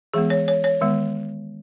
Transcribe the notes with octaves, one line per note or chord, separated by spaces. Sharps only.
E3 G#3 B3 G#4
C#5
C#5
C#5
D#3 G#3 B3